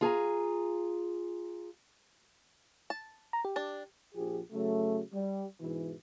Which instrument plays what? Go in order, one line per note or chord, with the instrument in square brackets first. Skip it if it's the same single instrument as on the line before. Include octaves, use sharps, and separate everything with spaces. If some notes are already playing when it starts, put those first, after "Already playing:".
[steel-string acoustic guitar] F4 G#4 G#5 A#5
[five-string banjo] A5
[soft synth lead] A#5
G4
[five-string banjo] D4 A5
[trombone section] A#1 F3 G4 G#4
C#3 F#3 A3
G3
G#2 B2 E3